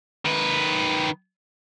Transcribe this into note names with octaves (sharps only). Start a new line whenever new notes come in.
D#3 B4